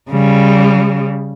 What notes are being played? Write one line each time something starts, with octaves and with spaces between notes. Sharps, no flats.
C#3 G3